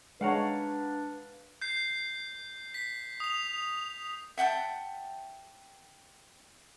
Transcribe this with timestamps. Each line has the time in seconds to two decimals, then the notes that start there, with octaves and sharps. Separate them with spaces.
0.21 G#3 D4 B4 C#5 F5 F#5 A#5
1.62 G6 C7
2.74 B6
3.20 D#6 F7
4.38 E5 F#5 G5 A5